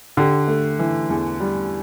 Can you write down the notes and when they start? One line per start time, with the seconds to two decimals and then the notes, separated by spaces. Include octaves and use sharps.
0.17 D3 G4
0.47 A3
0.79 E3
1.09 E2
1.40 G3